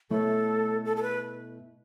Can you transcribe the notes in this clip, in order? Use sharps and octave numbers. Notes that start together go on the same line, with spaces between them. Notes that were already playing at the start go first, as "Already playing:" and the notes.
B2 A3 E4 A4 C#5
A4
A4
B4